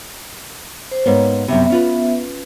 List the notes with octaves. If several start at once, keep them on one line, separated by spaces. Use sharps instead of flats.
C5
G#2 A#3 B3 C#5
F#2 C3 B3 E5
C#4 F4 B4